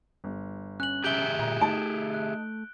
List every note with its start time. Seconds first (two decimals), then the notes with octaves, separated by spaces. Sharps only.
0.24 G1
0.80 C#4 F#6 F#7
1.04 G4 G#4 E5 G6 D7 G7
1.39 A#2 A#5
1.62 A3 D#4 A5 D7
2.14 F#6